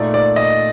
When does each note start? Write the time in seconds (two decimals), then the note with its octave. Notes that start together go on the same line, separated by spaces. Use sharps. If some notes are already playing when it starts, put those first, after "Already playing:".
Already playing: A#2 A3 D#4 D5
0.14 D5
0.36 D#5